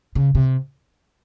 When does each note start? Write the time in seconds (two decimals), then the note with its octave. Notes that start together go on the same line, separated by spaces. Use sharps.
0.15 C#3
0.35 C3